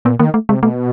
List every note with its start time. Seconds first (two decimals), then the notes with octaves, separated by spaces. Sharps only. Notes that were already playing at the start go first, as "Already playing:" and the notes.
0.05 A#2 B3
0.19 D#3 A#3
0.34 A3
0.49 C3 G#3
0.63 B2 A3